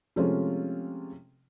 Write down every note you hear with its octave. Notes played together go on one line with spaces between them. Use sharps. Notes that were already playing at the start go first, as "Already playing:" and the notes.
C3 F3 G#3 A3 C#4 F4